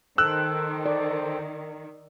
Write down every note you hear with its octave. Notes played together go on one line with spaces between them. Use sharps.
D#3 A4 C5 G5 E6 F#6
D5